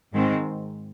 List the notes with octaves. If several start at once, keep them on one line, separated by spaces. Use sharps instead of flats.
G#2 D#3 G#3 C4